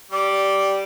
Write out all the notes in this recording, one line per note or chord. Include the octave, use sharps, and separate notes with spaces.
G3 D5